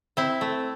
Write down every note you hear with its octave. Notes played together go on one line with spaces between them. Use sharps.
C4 E4
A3